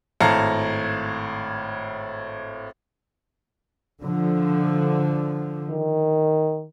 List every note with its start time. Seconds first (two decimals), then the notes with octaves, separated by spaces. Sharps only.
0.21 G#1 A2 F5 A5 A#5 C#7
4.03 D3 F3
5.70 D#3